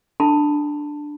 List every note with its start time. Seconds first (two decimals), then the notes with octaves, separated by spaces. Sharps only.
0.20 D4 A4 A5 B5